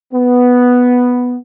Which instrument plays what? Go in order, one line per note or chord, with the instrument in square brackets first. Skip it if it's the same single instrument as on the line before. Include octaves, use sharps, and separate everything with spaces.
[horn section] B3